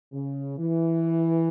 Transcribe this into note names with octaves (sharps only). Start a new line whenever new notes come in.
C#3
E3